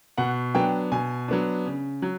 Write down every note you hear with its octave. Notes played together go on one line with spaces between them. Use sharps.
B2 F#5
F#3 B3 D4 G5
B2 G#5
F#3 B3 D4
C#3
F#3